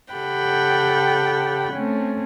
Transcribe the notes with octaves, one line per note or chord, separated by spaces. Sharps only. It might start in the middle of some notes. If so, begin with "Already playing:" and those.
C#3 G4 A4 F#5 G5 B5
A3 C4 C#4